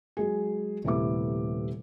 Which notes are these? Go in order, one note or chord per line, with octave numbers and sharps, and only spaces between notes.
F#3 G#3 G#4
D#1 C3 A3 B3 E4 D6